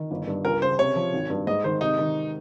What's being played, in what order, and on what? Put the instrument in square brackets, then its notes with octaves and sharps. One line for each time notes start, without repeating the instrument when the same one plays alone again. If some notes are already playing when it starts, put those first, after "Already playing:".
Already playing: [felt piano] D#3
G1
G2
[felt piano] C#2 [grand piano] A#4
[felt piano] C#3 [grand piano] C5
[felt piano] C3 [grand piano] C#5
[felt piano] F3
G#1
G2
[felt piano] G#2 [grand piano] D#5
[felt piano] D#3 [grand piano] C5
[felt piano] C3 [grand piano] D#4
[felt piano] D#3